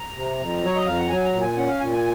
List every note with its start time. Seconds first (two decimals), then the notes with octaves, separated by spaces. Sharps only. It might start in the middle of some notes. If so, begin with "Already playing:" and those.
Already playing: A#5
0.15 C3
0.38 F2
0.61 F#3
0.66 C#5
0.76 D#5
0.85 F2 F5
0.99 F#5
1.09 F#3 G#5
1.25 A#5
1.33 A#2
1.41 G#5
1.57 C#4 F#5
1.69 F5
1.80 A#2 G#5
1.92 G#5